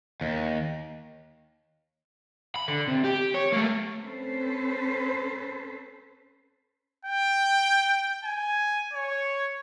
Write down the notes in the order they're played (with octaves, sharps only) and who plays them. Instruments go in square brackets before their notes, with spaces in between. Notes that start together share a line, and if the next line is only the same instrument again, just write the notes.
[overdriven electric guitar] D#2
B5
D3
C3
G4
C#5
A3 A#3
[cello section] C4 C#4 A4 B4 C5
[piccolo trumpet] G5
G#5
C#5